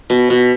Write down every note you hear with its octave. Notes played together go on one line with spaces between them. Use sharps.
B2
B2